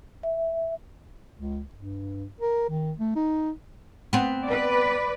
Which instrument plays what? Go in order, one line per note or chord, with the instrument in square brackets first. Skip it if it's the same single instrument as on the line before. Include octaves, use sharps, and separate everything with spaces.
[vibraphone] E5
[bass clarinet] C#2
G2
A#4
D#3
A3
D#4
[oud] B3 C4
[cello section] B4 D5